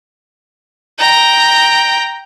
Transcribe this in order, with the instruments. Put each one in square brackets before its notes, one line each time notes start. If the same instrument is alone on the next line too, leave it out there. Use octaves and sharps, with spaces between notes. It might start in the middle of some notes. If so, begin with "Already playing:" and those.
[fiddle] G5 A#5